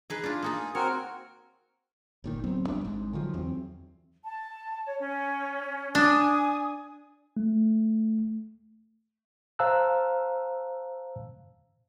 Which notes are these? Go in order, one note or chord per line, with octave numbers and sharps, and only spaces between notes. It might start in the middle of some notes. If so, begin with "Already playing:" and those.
D#4 G#4 B4
D4 F4
A#3 D#4 F4 G#4
C4 F#4 A#4 C#5
G1 A#2 D#3
D1 F#3 B3 C4
E1 F#2 G3 D4
G#1 G#2
D3 D#3 F3 F#3
E2 E3 F#3 C4
A5
C#5
C#4
D4 G#5 D#6
A3
C5 F5 A5 A#5 E6 F#6